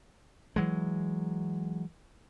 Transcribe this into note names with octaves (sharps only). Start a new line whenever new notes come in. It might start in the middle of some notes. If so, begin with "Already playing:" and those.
E3 F#3 G#3